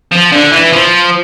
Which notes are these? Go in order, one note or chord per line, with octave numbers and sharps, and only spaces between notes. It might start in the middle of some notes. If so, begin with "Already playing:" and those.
F3
D3
E3
F3